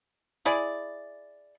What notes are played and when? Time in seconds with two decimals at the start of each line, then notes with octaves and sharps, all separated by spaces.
0.45 E4 G#4 D5